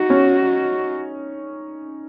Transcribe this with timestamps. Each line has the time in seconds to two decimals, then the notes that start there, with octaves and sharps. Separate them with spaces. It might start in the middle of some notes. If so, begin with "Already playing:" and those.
Already playing: D#4 F#4
0.10 C#4